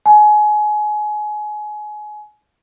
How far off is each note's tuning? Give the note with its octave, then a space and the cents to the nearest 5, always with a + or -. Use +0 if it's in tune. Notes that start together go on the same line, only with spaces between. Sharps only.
G#5 +25